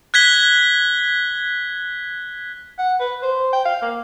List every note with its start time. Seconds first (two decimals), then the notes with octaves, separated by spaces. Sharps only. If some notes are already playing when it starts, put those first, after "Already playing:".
0.14 F#6 G#6 B6 G7
2.79 F#5
3.00 B4
3.23 C5
3.53 G5
3.65 F5
3.82 A#3